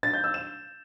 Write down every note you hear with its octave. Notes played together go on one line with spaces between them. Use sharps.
A6
G6
E6
E7